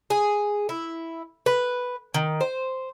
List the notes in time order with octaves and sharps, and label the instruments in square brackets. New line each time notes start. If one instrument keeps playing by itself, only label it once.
[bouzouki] G#4
E4
B4
D#3
C5